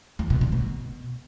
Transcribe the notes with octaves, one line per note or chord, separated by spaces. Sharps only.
E2
B2
D3
B2